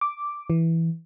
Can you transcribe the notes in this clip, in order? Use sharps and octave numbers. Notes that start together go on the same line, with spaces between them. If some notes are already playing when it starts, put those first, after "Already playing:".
D6
E3